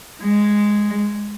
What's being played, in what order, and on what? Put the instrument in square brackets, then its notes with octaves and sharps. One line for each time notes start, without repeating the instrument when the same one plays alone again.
[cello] G#3